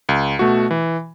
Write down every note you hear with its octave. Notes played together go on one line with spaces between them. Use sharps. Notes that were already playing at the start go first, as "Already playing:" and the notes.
C#2
B2 A3 F#4
E3